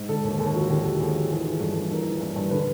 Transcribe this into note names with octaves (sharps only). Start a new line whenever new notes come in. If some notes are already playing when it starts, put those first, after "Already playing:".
Already playing: G#2
D3 A4
D#2 A4
D#2 A4
F3 F#4
D3 G4
D#2
D#2 G#4
F3
E3 G#4
E3
G2 A4
G2
E3 A#4
E3
G2
G2
D3 B4